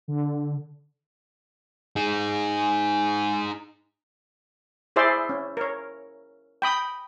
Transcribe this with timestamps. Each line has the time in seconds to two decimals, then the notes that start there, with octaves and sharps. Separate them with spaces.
0.08 D3
1.96 D#4 G#4
4.96 E4 G#4 C5 D5 E5 C6
5.29 C#4
5.57 A#4 C#5
6.62 G5 B5 D#6